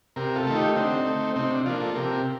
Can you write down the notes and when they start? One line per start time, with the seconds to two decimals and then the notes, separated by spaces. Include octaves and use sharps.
0.16 C3 G4 A#4
0.36 F4 A4
0.47 D#3 A3
0.56 D#4 G4
0.76 D3 C4 D#4
1.06 A3
1.35 C3 C4 D#4
1.51 D4
1.66 F3 A#3 D4 F4
1.80 F4 A4
1.95 C3 G4 A#4